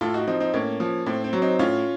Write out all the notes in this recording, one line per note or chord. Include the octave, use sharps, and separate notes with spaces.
A2 F4 A4
D#4 F#4
F3 C4 D#4
C4 D#4
A2 A#3 C#4
F3
A2 C4
C4
F#3
C4 D#4
A2 C#4 F4